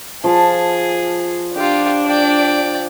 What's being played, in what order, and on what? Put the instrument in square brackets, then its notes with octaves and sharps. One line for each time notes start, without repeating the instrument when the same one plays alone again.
[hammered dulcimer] F3 A5 [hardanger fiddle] G#4
[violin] D4 [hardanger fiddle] F4 G4
[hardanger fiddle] D5 G5